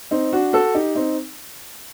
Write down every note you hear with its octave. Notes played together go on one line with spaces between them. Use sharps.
C4 D#4
D4 F#4
F#4 A4
D#4 G4
C4 D#4